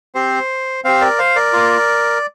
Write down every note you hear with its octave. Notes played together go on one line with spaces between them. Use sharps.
C4 G4 C5
C4 G4 C5 F5
A#4 D5
C5 F5
A#4 D5
A#3 F4